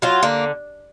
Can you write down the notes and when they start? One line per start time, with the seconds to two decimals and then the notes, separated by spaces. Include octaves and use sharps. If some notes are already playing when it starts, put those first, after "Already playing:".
0.02 F#3 F4
0.23 D3 A#3